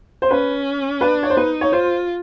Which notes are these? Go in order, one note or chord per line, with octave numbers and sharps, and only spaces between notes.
C5
C#4 B4
D4 B4
C#5
C5
D#4 B4
C#5
F4 C5